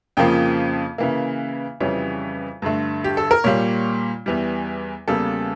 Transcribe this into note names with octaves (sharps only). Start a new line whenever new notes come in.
F2 C#3 F3 A#3 G5
C#3 E3 A#3
F2 C#3 E3 G3 C#5
G2 D3 A3
G4
A4
A#4
A#2 G3 A#3 C#5
E2 E3 G3
E2 C#3 G3 A#3 A4